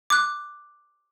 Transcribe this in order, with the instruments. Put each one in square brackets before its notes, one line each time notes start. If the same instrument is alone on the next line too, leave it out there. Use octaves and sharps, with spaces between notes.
[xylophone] D6 F#6